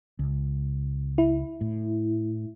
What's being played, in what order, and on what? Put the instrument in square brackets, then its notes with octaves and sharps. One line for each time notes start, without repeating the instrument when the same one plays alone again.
[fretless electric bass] C#2
[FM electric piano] E4
[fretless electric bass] A2